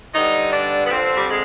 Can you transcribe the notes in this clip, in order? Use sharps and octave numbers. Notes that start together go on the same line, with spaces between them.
G2 D3 G3 D#4
D4
B3
F2 D3 F3 C4
G3
G#3